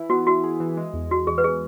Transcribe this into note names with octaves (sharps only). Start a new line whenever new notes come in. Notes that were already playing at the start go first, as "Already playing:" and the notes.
Already playing: E3 E4
B3 F#4
E4 F#4
G#4
E3
G#3
E2
E2 F#4
E2 G#4
B4
G#4